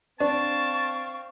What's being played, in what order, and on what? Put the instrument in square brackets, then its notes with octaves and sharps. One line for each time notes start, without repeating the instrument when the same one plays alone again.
[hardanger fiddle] C4 F5 [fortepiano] D4 [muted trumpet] A5 [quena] C#6